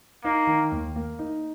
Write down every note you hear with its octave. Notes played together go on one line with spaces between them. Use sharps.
A#3 D#4
D#3
D#2
A#3
D#4